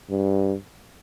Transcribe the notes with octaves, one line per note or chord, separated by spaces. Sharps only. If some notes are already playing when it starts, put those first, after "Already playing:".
G2